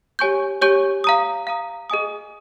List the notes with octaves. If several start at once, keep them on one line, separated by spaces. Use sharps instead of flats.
G4 C#5 G#5 C#6 G6
G4 C#5 G#5 C#6 G6
F5 A#5 D#6
F5 A#5 D#6
G#4 D#5 G#5 D#6